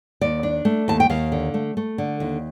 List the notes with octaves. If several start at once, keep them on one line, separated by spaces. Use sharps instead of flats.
D#2 D5
D4
A3
D#2 A5
G5
D#2 F5
D3
A3
A3
D3
D#2